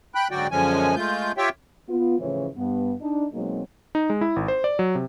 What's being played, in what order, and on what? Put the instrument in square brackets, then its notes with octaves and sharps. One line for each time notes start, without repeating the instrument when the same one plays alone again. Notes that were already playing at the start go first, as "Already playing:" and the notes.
[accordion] G5 B5 F#6
G#2 D3 F#3 F#4 D5 G5
F#2 D3 F3 G#3 C#4 G#5
G#3 A3 F4 G6
F4 G4 C#5 E5 G5
[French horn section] B3 F4
A2 C#3 E3 F3 F4 C#5
G2 B3
D4 D#4
B2 F#3 G#3 A#3 C4 D#4
[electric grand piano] D#4
G#3
E4
G#1
C5
D5
F#3
C3